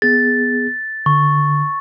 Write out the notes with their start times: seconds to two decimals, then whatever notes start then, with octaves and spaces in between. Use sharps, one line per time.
0.02 B3 G#4 A6
1.06 D3 C#6